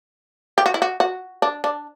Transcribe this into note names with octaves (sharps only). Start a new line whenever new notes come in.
G4
F#4
E4
F#4
F#4
D4
D4